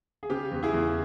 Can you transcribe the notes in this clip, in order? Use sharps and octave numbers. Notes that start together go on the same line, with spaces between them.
G#4
C#3 G4
E2
E4 G#4
E2